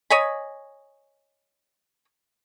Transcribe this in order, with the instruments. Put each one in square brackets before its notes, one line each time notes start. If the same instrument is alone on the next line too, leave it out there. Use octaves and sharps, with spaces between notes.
[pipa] C#5 D#5 G#5 B5